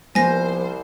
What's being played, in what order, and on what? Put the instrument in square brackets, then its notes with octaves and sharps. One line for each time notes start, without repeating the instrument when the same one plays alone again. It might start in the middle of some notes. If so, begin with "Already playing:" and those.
[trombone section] C2 [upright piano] F3 A#3 B3 [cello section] C5 [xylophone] G#5 A#6